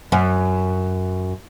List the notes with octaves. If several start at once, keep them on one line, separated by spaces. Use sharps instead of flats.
F#2